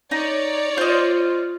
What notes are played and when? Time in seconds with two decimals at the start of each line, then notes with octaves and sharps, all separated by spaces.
0.11 D#4 C#5 D5
0.77 F4 C5 D#5